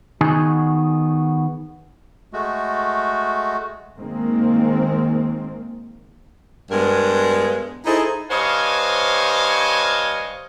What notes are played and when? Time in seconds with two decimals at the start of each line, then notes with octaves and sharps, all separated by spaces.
0.21 D#3 B3 D#4 F#4 G#4 G#5
2.33 G#3 A3 F#4
3.98 D#3 G#3 A#3 C4
6.71 G2 G#3 B3 A#4
7.85 D#4 E4 G#4 A4 C5 D#5
8.31 G2 C5 C#5 D#5 F5 G#5